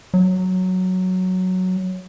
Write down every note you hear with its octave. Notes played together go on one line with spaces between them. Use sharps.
F#3